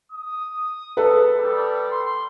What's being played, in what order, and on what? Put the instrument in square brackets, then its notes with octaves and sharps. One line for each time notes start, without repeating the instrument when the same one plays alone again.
[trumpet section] D#6
[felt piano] A4 B4
[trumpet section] G3
C6